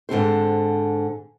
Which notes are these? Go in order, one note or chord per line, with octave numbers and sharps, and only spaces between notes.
G#2 D3 C4 C5